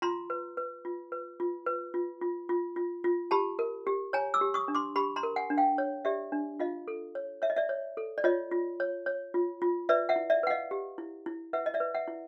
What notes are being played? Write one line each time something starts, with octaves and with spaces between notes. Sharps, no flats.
F4 A#5 C6
B4
B4
F4
B4
F4
B4
F4
F4
F4
F4
F4
G4 A5 B5
A#4
G4
C#5 G#5 A#5
D6 E6
G4
C#6 D#6
D4
C6 D6
G4 B5 C#6
A#5 C6
A#4
F#5 G#5
D4
F5 G5
C#5
G4 D5 E5
D4
F4 D#5 F5
A4
C#5
C#5 E5
D#5
D5 E5
C#5
A4
D5
F4 C#5 D#5
F4
C#5
C#5
F4
F4
B4 D5 E5
E5 F#5
E4
D5 E5
B4 F#5
D#5 F5
G4
E4
E4
B4 E5 F#5
D#5
D5 E5
B4
E5 F#5
E4